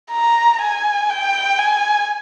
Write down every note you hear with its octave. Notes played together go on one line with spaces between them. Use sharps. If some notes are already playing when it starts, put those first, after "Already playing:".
A#5
G#5
G5
G#5